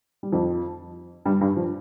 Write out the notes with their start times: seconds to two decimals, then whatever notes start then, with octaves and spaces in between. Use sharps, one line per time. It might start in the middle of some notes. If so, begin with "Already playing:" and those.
0.23 G3
0.32 F2 F3
1.25 G2 G3
1.41 G2 G3
1.57 F3